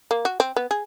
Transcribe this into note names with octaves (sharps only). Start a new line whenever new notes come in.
A#3
F#4
C4
B3
G#4